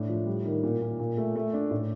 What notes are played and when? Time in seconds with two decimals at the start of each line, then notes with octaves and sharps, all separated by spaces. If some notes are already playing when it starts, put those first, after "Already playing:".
Already playing: A2 D4
0.09 F3
0.26 G3
0.45 D#3
0.63 A#2
0.82 A#2
1.00 A#2
1.17 A3
1.36 A3
1.53 D4
1.71 A2